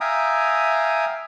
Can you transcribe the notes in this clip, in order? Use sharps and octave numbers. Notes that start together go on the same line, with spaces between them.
E5 F5 G5 G#5 A#5 D#6